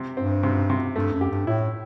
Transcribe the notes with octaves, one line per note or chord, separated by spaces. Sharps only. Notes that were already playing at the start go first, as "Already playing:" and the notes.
Already playing: C3
G2 C4
C3
C3
G2 A3
F#2
G4
G2
A2 E4